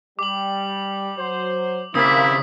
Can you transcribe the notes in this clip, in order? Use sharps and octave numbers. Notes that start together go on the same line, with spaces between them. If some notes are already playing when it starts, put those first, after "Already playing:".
G3 D6 F#7
F#3 C5
C#3 A#3 C4 E4 D#6 B6